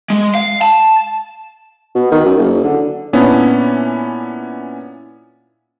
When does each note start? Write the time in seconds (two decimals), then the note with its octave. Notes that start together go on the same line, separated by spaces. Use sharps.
0.10 G#3
0.35 F5
0.62 A5
1.95 B2
2.12 D#3
2.25 F#2
2.38 F#1
2.64 D3
3.13 A#2 B3 C#4 D4 E4